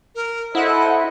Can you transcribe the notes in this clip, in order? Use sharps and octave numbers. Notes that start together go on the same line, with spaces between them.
A#4
E4 A4 C5 D#5 F#5